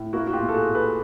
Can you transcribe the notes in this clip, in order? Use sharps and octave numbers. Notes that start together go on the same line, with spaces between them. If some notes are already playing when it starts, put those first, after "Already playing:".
Already playing: A2
A#3 E4 F#4
F#4
F4 G4
A#2
A4
F#4 G#4
A#2
A4 B4